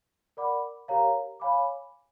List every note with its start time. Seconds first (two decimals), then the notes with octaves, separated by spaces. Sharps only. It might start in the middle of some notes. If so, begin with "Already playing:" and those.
0.37 A#4 D5 F#5 B5 D6
0.88 G4 A#4 C#5 F5 A#5
1.40 C#5 F5 G#5 B5 D6